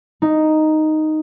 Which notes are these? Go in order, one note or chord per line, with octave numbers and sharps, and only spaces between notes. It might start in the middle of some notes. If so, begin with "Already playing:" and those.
D#4